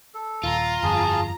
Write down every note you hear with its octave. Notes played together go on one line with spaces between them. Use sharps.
A4
D#1 F4 A#5
G1 F2 G#4 A5